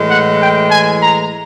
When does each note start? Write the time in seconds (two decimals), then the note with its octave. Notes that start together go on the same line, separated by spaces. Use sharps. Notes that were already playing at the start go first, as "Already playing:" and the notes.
Already playing: A2 E3 G#3
0.09 F#5
0.39 G5
0.70 G#5
1.01 A#5